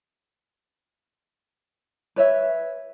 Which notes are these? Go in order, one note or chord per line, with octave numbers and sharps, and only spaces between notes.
B4 C#5 E5